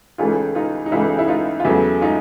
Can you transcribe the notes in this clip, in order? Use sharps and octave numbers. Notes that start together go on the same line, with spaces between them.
C#2 C#3 E3 A3 D#4 F4
D#4 F4
D#4
C#2 C#3 E3 A3 E4
E4
D#4 F4
F4
E2 C#3 F#3 A3 E4
D#4 F4